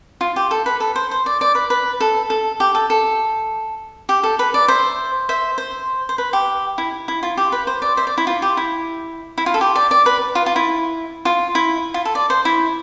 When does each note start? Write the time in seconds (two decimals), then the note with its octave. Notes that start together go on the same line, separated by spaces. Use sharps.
0.21 F4
0.36 G4
0.51 A4
0.66 B4
0.80 A4
0.96 C5
1.11 C5
1.26 D5
1.41 D5
1.55 B4
1.70 B4
2.01 A4
2.30 A4
2.60 G4
2.75 A4
2.90 A4
4.09 G4
4.23 A4
4.39 B4
4.54 D5
4.68 C5 E5
5.29 C5 E5
5.58 C5
6.09 C5
6.18 B4
6.33 G4
6.78 E4
7.08 E4
7.23 F4
7.37 G4
7.52 B4
7.67 C5
7.82 D5
7.97 C5 E5
8.07 D5
8.18 E4
8.27 F4
8.42 G4
8.57 E4
9.38 E4
9.46 F4
9.54 A4
9.61 G4
9.75 D5
9.91 D5
10.06 B4
10.35 F4
10.46 F4
10.56 E4
11.25 F4
11.55 E4
11.94 F4
12.05 A4
12.15 D5
12.30 C5
12.45 E4